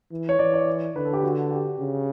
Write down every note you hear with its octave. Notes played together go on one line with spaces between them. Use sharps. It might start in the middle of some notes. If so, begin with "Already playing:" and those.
E3
C#5
E3 D5
D5
D3 B4
A4
G4
F#4
G4
C#3